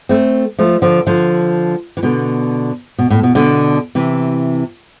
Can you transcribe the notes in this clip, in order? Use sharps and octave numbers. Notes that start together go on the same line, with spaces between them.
A3 C4
F3 A3
D3 F3
D3 F3
E3
B2 D3
B2
A2
B2
B2 D3
C3 E3